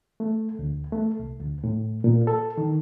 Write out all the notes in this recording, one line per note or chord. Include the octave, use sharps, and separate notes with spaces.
A3
D2
A3
C2
D2
A2
A#2
A4
D#3